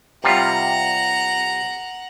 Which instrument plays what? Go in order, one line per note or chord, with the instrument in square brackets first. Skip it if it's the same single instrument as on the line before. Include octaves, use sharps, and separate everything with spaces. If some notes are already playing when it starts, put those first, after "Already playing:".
[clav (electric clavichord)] C3 G3 F4 [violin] F#5 A#5